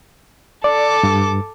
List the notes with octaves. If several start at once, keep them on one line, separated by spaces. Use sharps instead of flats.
A4 D5 D6
G2